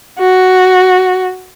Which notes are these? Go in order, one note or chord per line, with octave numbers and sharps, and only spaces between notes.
F#4